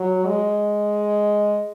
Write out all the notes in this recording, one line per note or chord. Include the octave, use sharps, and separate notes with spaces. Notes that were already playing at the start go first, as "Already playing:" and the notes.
Already playing: F#3
G#3